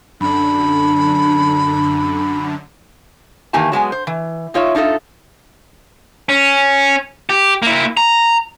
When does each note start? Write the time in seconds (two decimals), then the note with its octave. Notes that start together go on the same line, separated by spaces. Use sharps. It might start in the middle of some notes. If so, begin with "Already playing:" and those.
0.20 F#2 D3 D4 B5
3.53 D#3 E3 A#3 G4 G#5 A5
3.72 F#3 G#3 B3 G#5
3.92 C5
4.07 E3
4.54 D#4 F4 C#5 E5
4.75 D4 D#4 F4 A4 E5
6.29 C#4
7.30 G4
7.62 A#3 E4
7.97 A#5